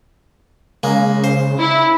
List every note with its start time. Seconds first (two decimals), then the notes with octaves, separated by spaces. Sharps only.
0.83 C#3 G#3 A#3
1.24 C5
1.60 E4